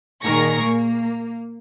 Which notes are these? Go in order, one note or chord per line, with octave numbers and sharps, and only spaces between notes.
A#2 D#3 G#4 A#4 C#6 A#6
A#3